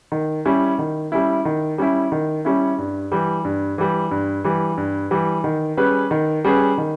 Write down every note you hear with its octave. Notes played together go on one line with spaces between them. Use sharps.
D#3
G3 C#4 E4
D#3
G3 C#4 E4
D#3
G3 C#4 E4
D#3
G3 C#4 E4
G2
E3 G3
G2
E3 G3
G2
E3 G3
G2
E3 G3
D#3
G3 C#4 G#4 B4
D#3
G3 C#4 G#4 B4
D#3